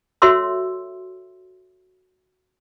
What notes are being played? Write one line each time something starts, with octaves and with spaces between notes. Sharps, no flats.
F#4 A4 C#5 E5 C6 E6